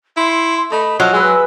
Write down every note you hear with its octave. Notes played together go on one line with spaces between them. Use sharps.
E4 C6
A3 D#5 B5
F3 F#3 D#5 F6
G#3 G#4 B4 E6